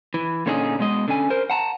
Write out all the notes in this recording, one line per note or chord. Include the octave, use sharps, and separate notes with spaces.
E3
A#2 D3 C#4 D#4 G#4
B2 G#3 D#5
D3 C#4 G#5
A#4 C5
F#5 A5 A#5